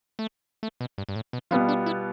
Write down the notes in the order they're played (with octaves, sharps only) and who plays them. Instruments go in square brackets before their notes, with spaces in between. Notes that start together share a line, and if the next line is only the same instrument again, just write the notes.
[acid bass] A3
A3
B2
G2
G2
A2
B2
[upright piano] B2 G3 B3 F4 [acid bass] F3
[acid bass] D4
E4